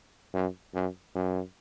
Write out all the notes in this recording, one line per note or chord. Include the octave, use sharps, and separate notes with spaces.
F#2
F#2
F#2